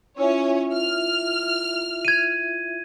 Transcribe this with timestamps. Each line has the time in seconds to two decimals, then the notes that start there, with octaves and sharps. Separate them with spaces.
0.18 C#4 E4 F4 C#5 E5
0.75 F6
2.05 G#6 D#7